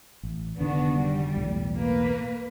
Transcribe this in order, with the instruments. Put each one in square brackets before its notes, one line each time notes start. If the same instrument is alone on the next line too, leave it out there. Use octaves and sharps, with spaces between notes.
[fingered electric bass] A1
[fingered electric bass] F1 D3 D#3 [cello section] B3 D4 F#4
[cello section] G3
[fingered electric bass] B1 E2 A2
[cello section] A#3 B4